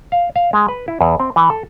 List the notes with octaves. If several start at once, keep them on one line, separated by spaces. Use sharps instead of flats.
F5
F5
G#3
B4
E4
E2
C4
E3
A4